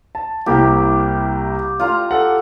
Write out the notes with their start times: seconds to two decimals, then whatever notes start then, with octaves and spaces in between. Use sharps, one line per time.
0.15 A5
0.46 C2 A#3 E4 G4
1.80 F4 A#5
2.11 A4 F#5